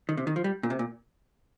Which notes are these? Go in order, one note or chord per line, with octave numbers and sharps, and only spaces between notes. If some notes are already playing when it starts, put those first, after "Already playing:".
D#3
C3
D#3
F3
G3
A#2
C3
A#2